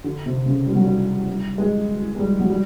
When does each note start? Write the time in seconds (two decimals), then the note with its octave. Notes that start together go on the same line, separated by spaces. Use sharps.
0.04 D3
0.26 C3
0.46 C#3
0.66 G3
0.75 F#3
0.84 G3
1.28 G3
1.58 G#3
2.15 G#3
2.19 G3
2.40 F#3
2.50 G3